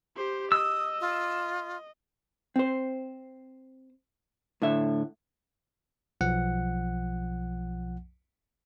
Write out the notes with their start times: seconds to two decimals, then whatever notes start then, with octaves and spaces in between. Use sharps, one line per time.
0.16 G4 C5
0.52 D#5 D#6 E6
1.01 F4
2.56 C4 C5
4.62 A2 D3 E5
6.21 B1 F3 F#5